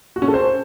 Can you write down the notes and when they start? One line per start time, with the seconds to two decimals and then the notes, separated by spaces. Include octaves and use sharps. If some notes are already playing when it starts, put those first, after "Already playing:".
0.16 F#4
0.22 C#4
0.28 A4
0.34 C5